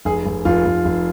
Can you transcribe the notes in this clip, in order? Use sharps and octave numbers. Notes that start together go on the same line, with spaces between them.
F1 G#4
F1
F1 F4
F1
F1